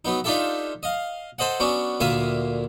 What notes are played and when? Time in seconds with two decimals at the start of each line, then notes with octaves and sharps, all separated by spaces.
0.05 F#3 B3 D#4
0.24 D4 D#4 F4 G4 A4 E5
0.83 D#5 F5
1.39 A4 C5 D#5 F#5
1.60 F#3 B3 C#4 D4
2.00 D2 A#2 A#4 E5 F5 D#6